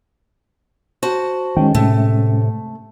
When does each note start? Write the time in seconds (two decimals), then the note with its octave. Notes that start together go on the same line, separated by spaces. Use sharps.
1.03 F#4 C5 A5
1.57 D#3 G#3 C#4 G5
1.75 A2 C3 A3